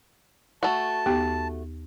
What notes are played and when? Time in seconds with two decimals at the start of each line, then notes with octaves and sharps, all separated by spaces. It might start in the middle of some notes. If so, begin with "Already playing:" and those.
0.63 A3 F#4 A5
1.06 D#2 B3 G4